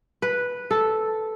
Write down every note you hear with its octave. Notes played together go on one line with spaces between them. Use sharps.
B4
A4